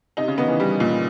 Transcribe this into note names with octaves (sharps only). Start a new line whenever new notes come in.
C3 D#4
C#3
D#3 B3
E3
G3
A#2